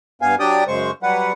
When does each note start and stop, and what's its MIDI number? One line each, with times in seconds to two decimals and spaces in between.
0.22 0.35 43
0.22 0.35 59
0.22 0.35 77
0.22 0.35 80
0.40 0.64 54
0.40 0.64 62
0.40 0.64 67
0.40 0.64 74
0.40 0.64 79
0.40 0.64 87
0.68 0.91 42
0.68 0.91 49
0.68 0.91 56
0.68 0.91 72
0.68 0.91 85
1.03 1.32 54
1.03 1.32 55
1.03 1.32 71
1.03 1.32 78